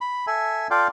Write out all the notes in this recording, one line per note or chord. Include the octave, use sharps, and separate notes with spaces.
B5
A4 E5 G#5
F4 A4 D5 F5 G5